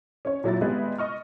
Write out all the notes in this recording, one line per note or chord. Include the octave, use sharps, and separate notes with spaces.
C#4 C#5
A#2 F#3 E4 A6
G3 G#3 B3 B4 D#5 E5
D#5 C#6 F6